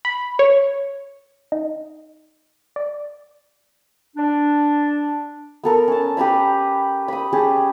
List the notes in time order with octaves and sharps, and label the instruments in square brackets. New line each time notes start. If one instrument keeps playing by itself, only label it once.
[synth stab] B5
C#5
D#4
D5
[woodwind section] D4
[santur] B3 A4 A#4
C#4 A5
G4 B4 A#5 B5
B5 D#6
C#4 G4 G#4 A5